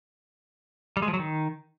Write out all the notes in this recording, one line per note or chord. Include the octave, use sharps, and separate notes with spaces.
G3
G#3
F3
F#3
D#3